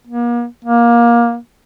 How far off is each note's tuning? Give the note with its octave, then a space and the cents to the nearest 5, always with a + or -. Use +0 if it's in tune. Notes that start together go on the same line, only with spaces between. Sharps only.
A#3 +40
A#3 +20